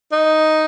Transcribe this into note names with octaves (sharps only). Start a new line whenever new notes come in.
D#4